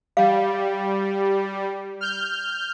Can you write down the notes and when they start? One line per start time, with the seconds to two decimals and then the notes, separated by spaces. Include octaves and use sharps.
0.17 G3 F5
2.01 F6 G6